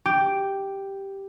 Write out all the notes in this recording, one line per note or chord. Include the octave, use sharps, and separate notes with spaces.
G4